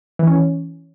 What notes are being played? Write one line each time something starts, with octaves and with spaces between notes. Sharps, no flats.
E3
C#4
E3